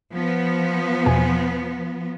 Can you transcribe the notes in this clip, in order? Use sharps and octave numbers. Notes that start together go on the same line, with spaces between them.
F3 B3
E2 B2 G#5